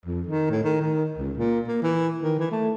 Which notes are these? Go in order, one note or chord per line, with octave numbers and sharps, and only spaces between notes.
F2
D#3
A2
D#3
D#3
C#2
A#2
A#3
E3
D#3
E3
A3